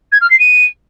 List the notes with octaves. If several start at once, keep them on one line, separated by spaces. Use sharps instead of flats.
G#6
F6
C7
D#7